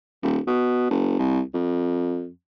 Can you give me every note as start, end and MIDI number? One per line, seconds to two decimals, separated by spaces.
0.22 0.39 27
0.47 0.87 47
0.90 1.18 30
1.19 1.41 36
1.54 2.28 41